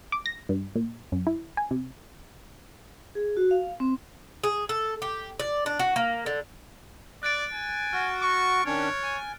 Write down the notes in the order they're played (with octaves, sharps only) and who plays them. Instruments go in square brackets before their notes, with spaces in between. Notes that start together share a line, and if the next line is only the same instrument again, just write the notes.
[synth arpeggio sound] D6
A#6
G2
A#2
F#2
E4
G#5
C3
[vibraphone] G#4
F#4
F5
C4
[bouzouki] G#4
A4
G4
D5
D4
F#4
A#3
D3
[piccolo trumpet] D5 [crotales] F#6 A6 D7
[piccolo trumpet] G#5
[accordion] F#4 [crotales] F6
[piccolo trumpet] C#6
[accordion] D#3 C#4 D4 [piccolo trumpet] C#5
[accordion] G#5